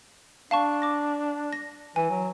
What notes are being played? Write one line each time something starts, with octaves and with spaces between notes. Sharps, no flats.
D4 F5 A5 C#6
D6 A#6
A#6
E3 G#5
F#3